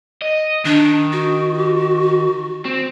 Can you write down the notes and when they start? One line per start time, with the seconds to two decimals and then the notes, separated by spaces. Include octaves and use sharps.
0.22 D#5
0.65 D#3 D4
1.12 F#4
2.65 C4